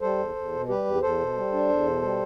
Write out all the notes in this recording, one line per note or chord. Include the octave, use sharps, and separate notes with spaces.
G3 A4 C5
E2
E2
B2
G3 G4 B4
E2
E2 A4 C5
B2
G3
D4
E2
B2
G3